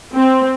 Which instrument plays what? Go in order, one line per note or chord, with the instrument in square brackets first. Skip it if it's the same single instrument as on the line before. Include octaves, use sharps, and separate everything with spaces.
[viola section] C4